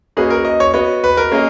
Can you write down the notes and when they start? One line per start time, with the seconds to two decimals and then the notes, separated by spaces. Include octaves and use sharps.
0.17 A#3 C#4 F#4 G#4 B4 D#5
0.30 A#4
0.45 D#5
0.60 C#5
0.74 B3 F#4 B4 C#5 D#5
1.04 B4
1.17 A#4
1.32 A#3 C#4 G#4 D#5